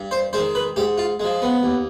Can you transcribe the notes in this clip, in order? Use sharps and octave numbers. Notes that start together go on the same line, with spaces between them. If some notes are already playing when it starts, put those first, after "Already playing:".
Already playing: G2
C5
D#3 G#3 C5
B4
G#2 G4
F4
F3 G#3
B3
D#2